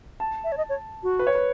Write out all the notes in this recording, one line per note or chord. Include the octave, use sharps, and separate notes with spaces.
A5
E5
C#5
D#5
C#5
F#4
B4
C#5
B4